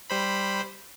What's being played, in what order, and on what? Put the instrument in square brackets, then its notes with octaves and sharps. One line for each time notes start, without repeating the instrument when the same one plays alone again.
[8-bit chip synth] G3 C5 B5